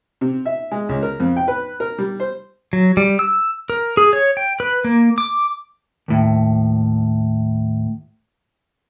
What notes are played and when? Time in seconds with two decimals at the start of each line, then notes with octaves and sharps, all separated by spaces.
0.21 C3
0.45 E5
0.71 G#3
0.89 C#2
1.03 A#4
1.20 F2
1.36 G5
1.48 B4
1.80 A#4
1.98 G3
2.20 C5
2.73 F#3
2.97 G3
3.19 E6
3.70 A#4
3.97 G#4
4.13 C#5
4.37 G5
4.60 B4
4.85 A#3
5.18 D6
6.08 D#2 A2